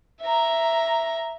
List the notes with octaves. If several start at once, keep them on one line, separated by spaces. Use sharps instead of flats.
E5 A#5